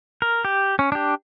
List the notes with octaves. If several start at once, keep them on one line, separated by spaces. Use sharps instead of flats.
A#4
G4
C#4
D4 G4